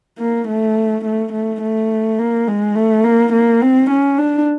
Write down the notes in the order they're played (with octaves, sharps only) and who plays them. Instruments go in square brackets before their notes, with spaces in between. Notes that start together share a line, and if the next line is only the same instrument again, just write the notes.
[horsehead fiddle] A#3
A3
A3
A3
A3
A#3
G#3
A3
A#3
A#3
C4
C#4
D4